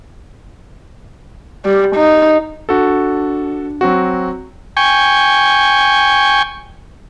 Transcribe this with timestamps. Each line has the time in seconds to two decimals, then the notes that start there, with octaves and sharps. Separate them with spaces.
1.66 G3
1.96 D#4
2.69 D4 F#4 A4
3.81 F#3 C4 F#4
4.77 G5 G#5 C#6